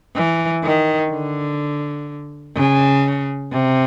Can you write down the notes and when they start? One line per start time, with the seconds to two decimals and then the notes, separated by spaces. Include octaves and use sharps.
0.16 E3
0.64 D#3
1.11 D3
2.56 C#3
3.52 C3